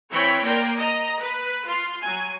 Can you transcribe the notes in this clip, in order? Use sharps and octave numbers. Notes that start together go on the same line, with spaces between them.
E3 C4 C#5 G5 B5
A#3 A#4 D5 G5 C6
D#5 A#5
B4
F4 C6
F#3 G#5